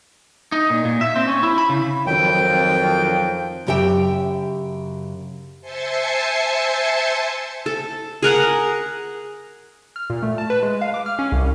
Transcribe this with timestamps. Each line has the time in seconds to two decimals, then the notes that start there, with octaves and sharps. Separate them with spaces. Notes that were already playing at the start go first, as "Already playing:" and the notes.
0.52 D#4
0.70 A#2
0.85 A#2
1.01 E5
1.16 C4
1.28 C#4
1.43 E4
1.58 B5
1.69 C#3
2.07 F2 D#3 F#3 C4 G5
3.67 F#2 C#3 G4 E5 G5
5.61 C5 E5 G#5 A5 C6 C#7
7.66 A4
8.23 G#4 A#4 F#5
9.96 F6
10.10 A#2
10.23 A3
10.38 A5
10.50 B4
10.63 G#3
10.81 F5
10.94 D6
11.06 F6
11.19 C#4
11.32 C2